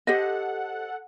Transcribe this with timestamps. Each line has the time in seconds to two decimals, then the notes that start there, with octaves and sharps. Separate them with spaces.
0.07 G4 A4 C5 D#5 F#5